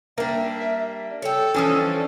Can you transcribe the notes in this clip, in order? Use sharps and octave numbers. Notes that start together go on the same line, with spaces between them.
G3 A#3 D4 E5
A4 C#5 G5
E3 F3 G3 C#4 D4 D#6